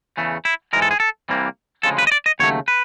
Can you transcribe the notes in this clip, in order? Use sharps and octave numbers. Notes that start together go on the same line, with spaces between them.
E2 C#3 E3 A3
E4
G#2 E3 G#3 A#4
A4
G#4
A4
C2 C3 E3 G3 A#3
D2 C#3 F3 G#3 A4
B4
D#5
D5
D#5
D#2 C#3 F#3 A3 C#5
B4